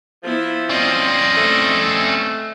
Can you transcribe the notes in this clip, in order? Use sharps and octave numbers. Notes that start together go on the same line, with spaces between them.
F3 B3 E4
C4 C#4 D5 D#5
A3